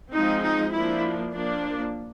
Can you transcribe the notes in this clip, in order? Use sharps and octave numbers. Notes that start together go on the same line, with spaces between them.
F3 G#3 C4 D#4
D#4
F3 A#3 D4 E4
F3 A#3 D4